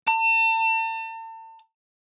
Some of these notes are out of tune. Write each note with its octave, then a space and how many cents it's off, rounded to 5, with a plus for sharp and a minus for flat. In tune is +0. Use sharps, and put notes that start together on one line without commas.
A5 +40